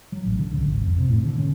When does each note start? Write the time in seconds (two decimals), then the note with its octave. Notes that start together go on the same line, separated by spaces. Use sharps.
0.12 F#3
0.25 A1
0.39 D3
0.51 C#2
0.63 G#1
0.81 F2
0.98 C3
1.10 A2
1.25 D3
1.38 C#4